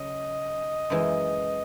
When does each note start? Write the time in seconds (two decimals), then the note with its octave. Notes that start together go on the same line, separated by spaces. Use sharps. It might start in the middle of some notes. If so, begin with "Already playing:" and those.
Already playing: C#3 F#3 D#5
0.90 F#2 E3 G#3